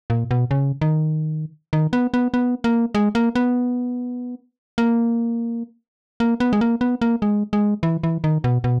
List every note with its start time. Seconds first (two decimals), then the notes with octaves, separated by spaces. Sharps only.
0.10 A#2
0.31 B2
0.51 C#3
0.81 D#3
1.73 D#3
1.93 B3
2.14 B3
2.34 B3
2.64 A#3
2.95 G#3
3.15 A#3
3.35 B3
4.78 A#3
6.20 A#3
6.40 B3
6.53 G#3
6.61 A#3
6.81 B3
7.01 A#3
7.22 G#3
7.53 G#3
7.83 E3
8.04 E3
8.24 D#3
8.44 B2
8.64 B2